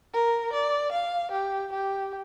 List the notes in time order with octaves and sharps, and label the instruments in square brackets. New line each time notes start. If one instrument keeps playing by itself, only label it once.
[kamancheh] A#4
D5
F5
G4
G4